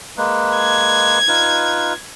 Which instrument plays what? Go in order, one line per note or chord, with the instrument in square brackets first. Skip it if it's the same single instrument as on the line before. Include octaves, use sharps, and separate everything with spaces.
[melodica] G#3 A#3 B4
[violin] G#6
[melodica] D#4 F4 B4